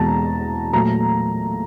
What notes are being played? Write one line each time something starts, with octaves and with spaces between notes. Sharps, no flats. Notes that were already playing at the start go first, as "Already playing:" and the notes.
Already playing: E2 B2 G#3 A5 A#5
A#2 F#3 A3 A#5